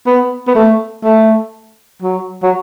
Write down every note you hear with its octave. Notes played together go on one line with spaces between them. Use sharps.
B3
B3
A3
A3
F#3
F#3